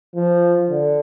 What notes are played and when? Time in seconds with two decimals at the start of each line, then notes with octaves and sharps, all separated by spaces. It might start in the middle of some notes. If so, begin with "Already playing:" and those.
0.15 F3
0.70 D3